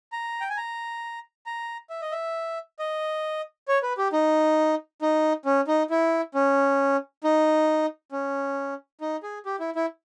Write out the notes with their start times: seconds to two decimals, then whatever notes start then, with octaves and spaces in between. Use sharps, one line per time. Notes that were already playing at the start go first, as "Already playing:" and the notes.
0.12 A#5
0.41 G5
0.50 G#5
0.57 A#5
1.46 A#5
1.90 E5
2.02 D#5
2.12 E5
2.79 D#5
3.68 C#5
3.83 B4
3.98 G4
4.13 D#4
5.02 D#4
5.45 C#4
5.68 D#4
5.90 E4
6.34 C#4
7.24 D#4
8.12 C#4
9.01 D#4
9.23 G#4
9.46 G4
9.60 E4
9.76 E4